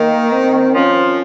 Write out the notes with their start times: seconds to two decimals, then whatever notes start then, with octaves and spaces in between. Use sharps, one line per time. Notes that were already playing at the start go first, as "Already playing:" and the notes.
Already playing: D#3 A#3
0.32 C4
0.74 F3 C#4